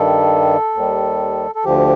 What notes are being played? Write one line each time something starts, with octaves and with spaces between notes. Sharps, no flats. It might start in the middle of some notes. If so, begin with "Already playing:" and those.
Already playing: G2 D#3 G3 A4
D#2 D#3 G3
A4
D2 D3 F3 G4